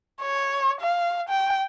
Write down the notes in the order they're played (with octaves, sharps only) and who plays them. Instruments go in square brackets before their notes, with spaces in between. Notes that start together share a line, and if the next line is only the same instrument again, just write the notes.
[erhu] C#5
F5
G5